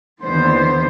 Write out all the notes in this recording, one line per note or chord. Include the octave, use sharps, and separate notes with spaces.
D#2 D3 E3 B3 C5